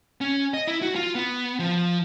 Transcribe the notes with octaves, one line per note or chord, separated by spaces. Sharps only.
C#4
D#5
E4
F#4
F4
B3
F3